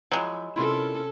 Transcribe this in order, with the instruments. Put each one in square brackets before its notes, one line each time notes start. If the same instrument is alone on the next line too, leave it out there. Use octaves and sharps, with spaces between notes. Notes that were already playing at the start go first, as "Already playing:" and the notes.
[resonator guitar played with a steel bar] F3 E4 [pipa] F#3 G#3
[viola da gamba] C3 C#4 A4 [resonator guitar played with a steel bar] E4 F4 A#4